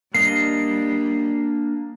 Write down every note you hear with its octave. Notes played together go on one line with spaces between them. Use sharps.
G3 A#3 D4 D#5 C7